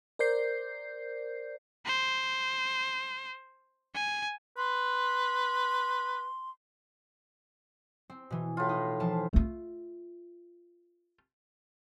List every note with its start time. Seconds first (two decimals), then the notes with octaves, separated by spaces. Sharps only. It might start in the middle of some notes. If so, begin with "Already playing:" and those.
0.19 A#4 C5 D5 G6 C7
1.86 C5
3.95 G#5
4.57 B4 C6
8.10 C4
8.30 B2 E3
8.57 A2 F4
8.69 D#4
9.00 E3 F3 A5
9.33 A3 F4